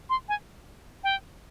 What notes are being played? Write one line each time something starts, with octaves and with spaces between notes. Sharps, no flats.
C6
G#5
G5